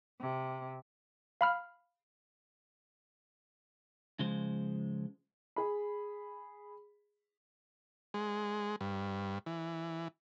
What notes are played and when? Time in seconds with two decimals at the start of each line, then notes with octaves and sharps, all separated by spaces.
0.20 C3
1.41 F5 B5 F6
4.19 C#3 F3 G#3 C5
5.56 G#4 B5
8.14 G#3
8.81 G2
9.46 E3